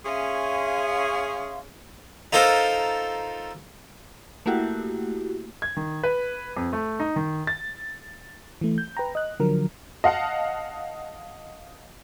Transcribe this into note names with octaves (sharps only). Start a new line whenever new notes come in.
C#4 G#4 E5 F5 C6
D#4 F4 A4 A#4 C5
A3 A#3 E4 F#4 G4
G#6
D#3
B4
F2
A3
D#4
D#3
A6
E3 A3
G6
B4 G5 A#5
D#5 F#6
D3 F3 F#3 A#4
D#5 F5 F#5 A5